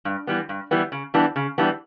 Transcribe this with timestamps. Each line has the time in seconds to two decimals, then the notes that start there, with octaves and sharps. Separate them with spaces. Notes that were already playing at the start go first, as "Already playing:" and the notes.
0.05 G2
0.27 E3 G3 B3
0.49 G2
0.71 E3 G3 B3
0.92 C#3
1.14 E3 G3 B3 D4
1.36 C#3
1.58 E3 G3 B3 D4